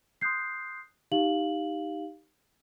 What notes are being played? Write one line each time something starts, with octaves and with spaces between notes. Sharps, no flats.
C6 D#6 F#6 G6 C7
D#4 G4 F5 F#7